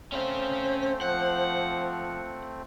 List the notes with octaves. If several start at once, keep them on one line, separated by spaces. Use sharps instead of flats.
A3 C4 C#4 C5 F5
F3 F#5